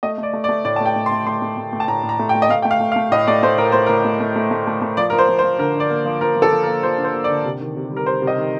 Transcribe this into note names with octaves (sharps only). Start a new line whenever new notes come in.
A3 D#5
A3 D5
A3
D5
A3
A2 D5
A5
A3
G5
A2
C6
A3
A3 C6
A3
A3
A3
A5
A2 A#5
A2
A#5
A3
G5
A3
D#5
A3 F5
A3 G5
F5
A3
F5
A3
A2 D#5
A3 D5
A3 C5
A2 A#4
A3 C5
A2 A#4
A3
A3
A3
A3
A3
A3
F3 D5
A#4
F3
C5
F3
C5
F3
D3 A#4
D3 D5
A#3
F3
F3 A#4
F3
A4
F3
A#4
A#3
F3 C5
D3
C5
A#3
D5
D3
C3
D#3
C3
G3 A#4
G3 C5
C3
D#5
D#3